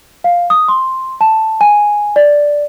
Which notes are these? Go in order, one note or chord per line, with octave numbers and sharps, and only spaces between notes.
F5
D#6
C6
A5
G#5
D5